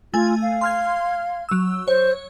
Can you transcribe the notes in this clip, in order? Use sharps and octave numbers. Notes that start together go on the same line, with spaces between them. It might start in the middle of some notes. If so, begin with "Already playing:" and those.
A3 F4 G#5
F5
C6 F6 G#6
F#3 E6
C5 C#5